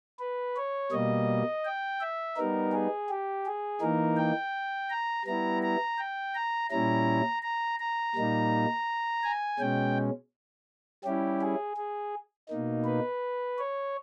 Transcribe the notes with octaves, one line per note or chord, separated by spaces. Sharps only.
B4
C#5
B2 G3 A#3 D#5
G5
E5
G3 B3 D#4 A#4
G#4
G4
G#4
E3 A#3 D#4 A#4
G5
A#5
G3 B3 E4 A#5
A#5
G5
A#5
A#2 G3 C#4 E4 A#5
A#5
A#5
A#2 G3 A#3 D#4
G#5
B2 G#3 C#4 G5
G3 C#4 E4 G4
G#4
G#4
B2 A#3 D#4
B4
C#5